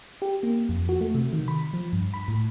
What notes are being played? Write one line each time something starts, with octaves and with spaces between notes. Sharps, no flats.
G4
A#3
F2
F#4
A3
C3
D#3
B5
F3
G2
B5
A2